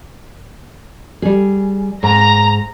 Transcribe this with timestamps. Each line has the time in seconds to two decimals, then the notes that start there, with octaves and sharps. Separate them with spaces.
1.22 G3 G#4
2.03 G#2 A#5